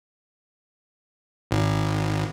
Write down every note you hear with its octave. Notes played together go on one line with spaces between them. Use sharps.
G#1